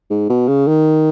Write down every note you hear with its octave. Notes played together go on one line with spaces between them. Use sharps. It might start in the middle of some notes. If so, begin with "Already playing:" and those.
G#2
B2
C#3
D#3